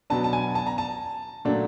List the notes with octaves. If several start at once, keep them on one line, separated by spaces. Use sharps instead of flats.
B2 F#3 B3 D4 A5
A5
G#5
A5
A#5
A5
A#2 F#3 A3 D4